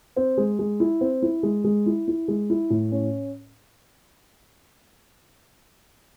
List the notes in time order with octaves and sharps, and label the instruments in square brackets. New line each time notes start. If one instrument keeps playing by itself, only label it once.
[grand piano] C4
G#3
G#3
E4
C4
E4
G#3
G#3
E4
E4
G#3
E4
A2
C#4